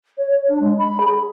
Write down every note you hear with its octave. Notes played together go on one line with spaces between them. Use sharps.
C#5
C#5
D4
G#3
B5
G#4